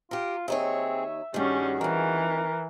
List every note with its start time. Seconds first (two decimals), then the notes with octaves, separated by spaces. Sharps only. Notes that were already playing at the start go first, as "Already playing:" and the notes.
0.11 F4 G4 A#4
0.48 D#2 C4 D#4 G#4 C#5 E5
1.34 G2 D#3 G3 C#4 F#4 G#4
1.81 F2 D#3 E3 A#4